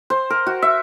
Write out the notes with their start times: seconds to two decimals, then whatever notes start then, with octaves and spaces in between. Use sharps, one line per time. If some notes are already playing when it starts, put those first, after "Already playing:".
0.10 C5
0.30 A#4
0.47 F#4
0.62 E5